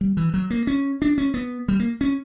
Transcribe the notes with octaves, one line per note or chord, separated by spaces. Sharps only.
G3
E3
F#3
A#3
C#4
D4
C#4
B3
G3
A#3
C#4